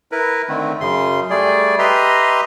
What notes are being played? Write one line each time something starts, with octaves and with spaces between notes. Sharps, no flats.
E4 A#4 B4
D3 D#3 A3 C4
F#2 C#3 C6
G3 A3 G#4 D5
G4 B4 D#5 E5 A#5 C6